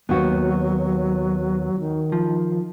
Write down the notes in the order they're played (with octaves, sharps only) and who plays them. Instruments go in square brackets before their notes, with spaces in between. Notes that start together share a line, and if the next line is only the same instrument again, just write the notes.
[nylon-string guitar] D#2 F#4 [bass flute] F#3 [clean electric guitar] B3
[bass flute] D#3
[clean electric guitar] F3